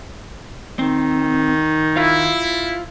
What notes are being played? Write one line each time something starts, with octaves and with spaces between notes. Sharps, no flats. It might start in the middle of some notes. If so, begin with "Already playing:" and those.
D#3 C4
E4 F4 F5